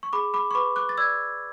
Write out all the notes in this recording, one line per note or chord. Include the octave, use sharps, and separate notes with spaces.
C#6
G#4 B5 D6
B5 D6
C#6
B4 B5 D6
D6 F#6
A6
D5 E6 G#6